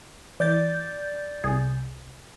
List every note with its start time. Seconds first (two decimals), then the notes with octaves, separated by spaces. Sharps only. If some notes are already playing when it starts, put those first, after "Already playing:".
0.40 E3 D5 G6 A6
1.44 C2 G#4